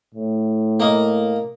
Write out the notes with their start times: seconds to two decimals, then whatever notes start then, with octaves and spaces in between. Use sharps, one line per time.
0.15 A2
0.80 A#3 D#5